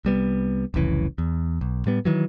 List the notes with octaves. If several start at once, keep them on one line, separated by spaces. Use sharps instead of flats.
C2 G3 B3
F1 C2 C#3 E3
E2
B1
A2 G3 B3
D#3 E3 F#3